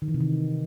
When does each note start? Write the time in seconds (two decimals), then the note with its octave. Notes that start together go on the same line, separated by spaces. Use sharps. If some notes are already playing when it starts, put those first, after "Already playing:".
0.02 D#3
0.08 E3
0.14 C3
0.20 D#3